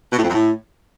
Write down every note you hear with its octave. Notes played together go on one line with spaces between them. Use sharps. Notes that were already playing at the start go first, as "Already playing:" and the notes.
B2
A2
F2
F#2
A2